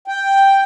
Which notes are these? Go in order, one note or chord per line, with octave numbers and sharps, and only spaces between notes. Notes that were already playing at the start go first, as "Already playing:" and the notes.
G5